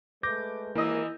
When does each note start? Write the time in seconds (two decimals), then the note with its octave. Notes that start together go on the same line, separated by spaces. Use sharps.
0.23 G#3 A3 B4 D6 G6 A#6
0.75 G#1 D#2 G#2 E3 A#3 E4 D#5 E6